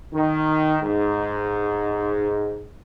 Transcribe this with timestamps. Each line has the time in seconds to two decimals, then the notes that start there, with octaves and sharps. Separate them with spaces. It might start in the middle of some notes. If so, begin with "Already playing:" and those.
0.13 D#3
0.81 G#2